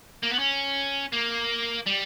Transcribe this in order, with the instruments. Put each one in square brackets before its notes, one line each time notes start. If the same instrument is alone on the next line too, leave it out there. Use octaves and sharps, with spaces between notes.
[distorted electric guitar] A#3
B3
C#4
A#3
G3